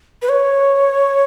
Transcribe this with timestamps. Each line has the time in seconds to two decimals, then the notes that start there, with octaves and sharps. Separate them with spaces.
0.22 B4
0.29 C#5